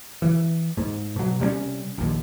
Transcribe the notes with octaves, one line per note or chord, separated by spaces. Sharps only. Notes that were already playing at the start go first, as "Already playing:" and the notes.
E3
G#2
B2 F#3
C3 G3 G#3 C#4
A#1 D#2